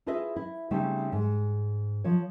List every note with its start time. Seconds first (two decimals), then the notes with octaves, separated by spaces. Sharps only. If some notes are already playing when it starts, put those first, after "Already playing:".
0.07 E4 F4 G#4 B4 D#5 E5
0.36 E4
0.71 C#3 G3 A3 C4 C#4 D#4
1.12 G#2
2.04 F3 C#5